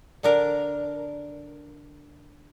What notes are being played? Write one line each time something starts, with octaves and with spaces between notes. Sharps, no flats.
D3 D4 A#4